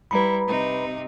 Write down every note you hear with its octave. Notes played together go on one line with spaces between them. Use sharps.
G3 E4 B4 A#5 B5
C3 D#4